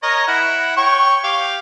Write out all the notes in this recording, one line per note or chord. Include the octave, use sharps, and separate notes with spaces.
A#4 C#5 D#5
E4 F#5
C#5 G5 C#6
G4 F5